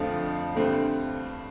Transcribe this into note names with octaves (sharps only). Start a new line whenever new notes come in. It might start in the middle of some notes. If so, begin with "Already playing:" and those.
Already playing: F2 D3 F3 A3 C4 F5
G2 D3 A3 C4